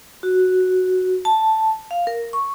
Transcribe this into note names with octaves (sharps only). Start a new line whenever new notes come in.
F#4
A5
F5
A#4
C#6